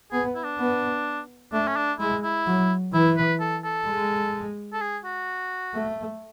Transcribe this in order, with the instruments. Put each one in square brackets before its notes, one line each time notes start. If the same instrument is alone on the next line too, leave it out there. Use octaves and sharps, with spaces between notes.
[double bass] B3 [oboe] G#4
[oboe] E4
D4
[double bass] B3
[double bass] A3 [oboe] D4
[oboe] C#4
D4
[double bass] G#3 [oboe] E4
[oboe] E4
[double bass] F#3
[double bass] E3 [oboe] E4
[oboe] B4
A4
A4
[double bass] G#3
[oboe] A4
G#4
F#4
[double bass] A3